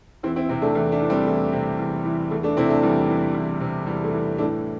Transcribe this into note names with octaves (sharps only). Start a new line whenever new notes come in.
E2 C4 E4
C4 E4
C3 C4 E4
A3 D4
E2 A3
A3 D4
E3
G3 C4
E2 A3
C3
E2
E3
E2 A3
A3 D4
C3 C4 E4
A3 D4
E2 G3
E3
E2
C3
E2 G3
A3
E3
A2 A3 D4